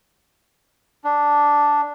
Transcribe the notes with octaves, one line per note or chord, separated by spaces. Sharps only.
D4